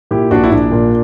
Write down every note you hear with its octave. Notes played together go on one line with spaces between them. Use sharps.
A#2 E4 G4
A#1 D4 F#4
E4
A#1 D4
A#2